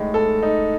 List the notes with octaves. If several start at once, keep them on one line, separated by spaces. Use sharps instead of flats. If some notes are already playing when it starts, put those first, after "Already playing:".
Already playing: A2 G#3 D#4
A4
D#4